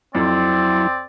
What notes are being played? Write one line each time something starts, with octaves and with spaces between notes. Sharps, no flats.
F2 F#3 C4 E4 D5